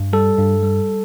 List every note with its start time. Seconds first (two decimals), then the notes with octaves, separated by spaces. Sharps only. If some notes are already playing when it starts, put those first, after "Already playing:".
Already playing: G2
0.13 G3 A4
0.38 G2
0.63 G3